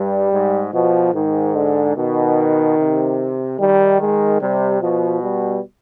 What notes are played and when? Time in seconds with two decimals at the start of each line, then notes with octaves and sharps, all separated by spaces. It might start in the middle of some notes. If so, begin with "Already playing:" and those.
Already playing: G2 G3
0.33 G#2
0.73 B2 F3
1.14 G#2 D#3
1.55 D3
1.97 B2 D#3
2.77 C3
3.59 D#3 G3
4.00 G#3
4.41 C3 G3
4.81 B2 F3
5.23 G3